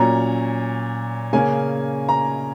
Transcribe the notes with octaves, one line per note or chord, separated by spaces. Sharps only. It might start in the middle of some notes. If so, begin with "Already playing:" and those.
Already playing: A#2 F#3 C#4 A#5
C#3 A#3 C#4 G#5
A#5